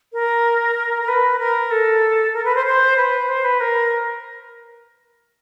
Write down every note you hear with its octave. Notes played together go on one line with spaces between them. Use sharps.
A#4
A#4
B4
A#4
A4
A#4
B4
C5
C5
B4
C5
B4
A#4